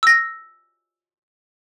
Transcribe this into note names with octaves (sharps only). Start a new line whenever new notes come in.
E6 A#6